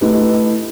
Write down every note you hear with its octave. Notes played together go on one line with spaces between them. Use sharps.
A3 E4 G4 B4 D#5